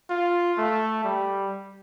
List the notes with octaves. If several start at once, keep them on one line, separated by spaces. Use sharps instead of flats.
F4
A3
G3